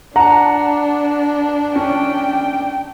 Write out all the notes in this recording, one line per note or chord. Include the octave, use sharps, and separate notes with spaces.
D4 F#5 A5 A#5
C#4 G5